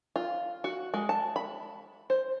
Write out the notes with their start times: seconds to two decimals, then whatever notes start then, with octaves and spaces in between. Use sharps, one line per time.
0.16 F4
0.64 F#4
0.94 G#3
1.09 A5
1.36 B5
2.10 C5